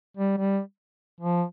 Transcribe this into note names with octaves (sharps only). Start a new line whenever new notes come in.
G3
G3
F3